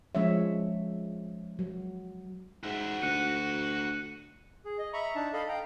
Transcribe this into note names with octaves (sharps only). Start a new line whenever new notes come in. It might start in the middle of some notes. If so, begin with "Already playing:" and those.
F3 G#3 C#4 C#5 E5
F#3
G#2 F#4 E5
D2 F#6 C#7 D#7
G#4
D#5
E5 A#5 B5 C#6
D4 D#4 A5
A4 D#5 F5 B5
F5 G5 A#5